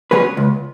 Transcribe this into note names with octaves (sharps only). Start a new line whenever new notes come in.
F#3 C#4 G#4 B4
C#2